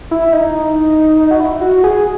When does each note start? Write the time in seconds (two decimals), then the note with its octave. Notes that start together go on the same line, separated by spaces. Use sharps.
0.11 E4
0.33 D#4
1.31 F#4
1.40 E4
1.61 F#4
1.84 G#4